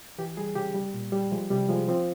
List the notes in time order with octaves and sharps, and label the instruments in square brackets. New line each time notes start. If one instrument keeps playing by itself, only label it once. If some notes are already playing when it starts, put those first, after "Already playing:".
[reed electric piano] E3 G4
G3 G#4
C#3 G4
G3
A#2
G3
F3 G#3
C3 G3
F3 G#3
F3 C4